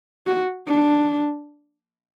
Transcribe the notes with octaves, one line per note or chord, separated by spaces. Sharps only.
F#4
D4